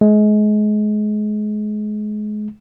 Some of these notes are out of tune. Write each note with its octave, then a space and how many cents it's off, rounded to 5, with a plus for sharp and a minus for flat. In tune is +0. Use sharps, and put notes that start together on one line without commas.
G#3 +30